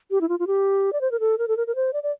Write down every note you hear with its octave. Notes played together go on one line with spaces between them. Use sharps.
G4
E4
F4
F4
G4
D5
C5
A#4
A4
A#4
A4
A#4
A#4
C5
D5
D5